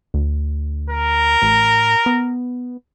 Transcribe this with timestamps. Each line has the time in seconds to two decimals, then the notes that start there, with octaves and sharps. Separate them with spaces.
0.14 D2
0.90 A#4
1.42 A1
2.06 B3